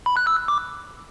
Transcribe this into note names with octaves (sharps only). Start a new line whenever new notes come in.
B5
F#6
E6
D6